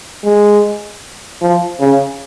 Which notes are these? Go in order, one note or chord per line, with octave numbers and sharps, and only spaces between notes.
G#3
F3
C#3